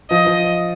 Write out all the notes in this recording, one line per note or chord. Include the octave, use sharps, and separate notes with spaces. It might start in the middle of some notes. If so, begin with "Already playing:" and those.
F3 D#5
F3